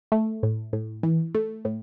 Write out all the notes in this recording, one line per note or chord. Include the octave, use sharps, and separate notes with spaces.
A3
A2
A2
E3
A3
A2